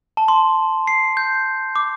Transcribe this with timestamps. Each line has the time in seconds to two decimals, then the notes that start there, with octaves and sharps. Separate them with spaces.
0.17 A5
0.28 C6
0.87 C7
1.17 G6
1.76 D6